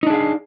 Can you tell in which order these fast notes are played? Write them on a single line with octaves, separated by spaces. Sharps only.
D#4 D4 G#4 F5